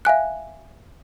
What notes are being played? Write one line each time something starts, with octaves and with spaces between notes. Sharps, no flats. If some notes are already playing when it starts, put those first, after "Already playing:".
E5 F5 G#5 F#6